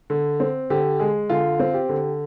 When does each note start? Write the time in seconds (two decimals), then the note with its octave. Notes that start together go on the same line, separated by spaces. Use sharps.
0.10 D3
0.40 C4
0.70 D3 G4
0.99 G#3 G#4
1.30 D3 F4
1.60 C4
1.74 G4
1.89 D3